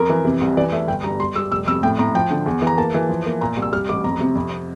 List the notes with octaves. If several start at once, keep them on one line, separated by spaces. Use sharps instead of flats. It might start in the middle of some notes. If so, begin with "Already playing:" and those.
Already playing: F2 A#4
E3
C3
C2
E3 D5
A3 E5
G1 G5
G2 A#5
G3 C6
G3 E6
F1 E6
F2 E6
A2 G5
A2 A#5
F3 G5
D3
E2
E3
A#5
A#3 A5
E3
F3
A#3
A#2 A#5
C2
E6
G3 F6
A1 D6
F2 A#5
C3
F2